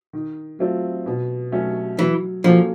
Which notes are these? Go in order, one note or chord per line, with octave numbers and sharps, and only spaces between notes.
D#3
F#3 A3 C4 F4
B2
F#3 A3 C#4 F#4
E3 F#3
F3 A#3 C#4 F#4 A4